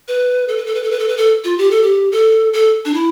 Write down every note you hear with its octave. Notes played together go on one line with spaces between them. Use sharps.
B4
A4
B4
A4
B4
A4
B4
A4
B4
A4
F4
G4
A4
G4
A4
A4
D4
E4